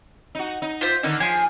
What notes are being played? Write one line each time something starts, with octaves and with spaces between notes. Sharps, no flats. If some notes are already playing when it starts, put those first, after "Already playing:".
D#4 F#4
D#4
F4 C5 E5
D3 D#3 A#3 D#4
F3 G#4 G#5 C6